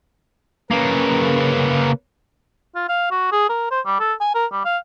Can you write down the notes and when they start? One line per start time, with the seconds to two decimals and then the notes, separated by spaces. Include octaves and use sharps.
0.71 C#3 A#3 A#4 B4
2.75 F4
2.89 F5
3.11 F#4
3.32 G#4
3.49 A#4
3.71 C5
3.86 G3
4.00 A4
4.21 G#5
4.35 A#4
4.52 G3
4.65 F5